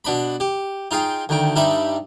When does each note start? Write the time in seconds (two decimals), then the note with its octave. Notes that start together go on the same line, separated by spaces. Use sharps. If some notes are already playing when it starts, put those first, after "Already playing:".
0.05 B2 D4 B5
0.40 G4
0.91 D#4 F4 G#4 G5
1.29 D2 D#3 G5
1.56 G2 G3 D#4 E5 B5